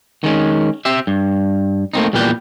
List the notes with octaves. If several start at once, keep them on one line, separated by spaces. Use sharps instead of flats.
D#3 G#3 C#4
C4 G4 C5 E5
G2
A3 A#3 C4 D#4
E2 A#2 G3 A#3 B4 G5